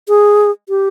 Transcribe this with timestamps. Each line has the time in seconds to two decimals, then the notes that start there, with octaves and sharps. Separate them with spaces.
0.08 G#4
0.69 G4